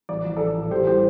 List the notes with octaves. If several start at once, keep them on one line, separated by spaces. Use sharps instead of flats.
A1 D5
F3
A1 A4 D5
A2
A1 G4 C5
G3 G4 C5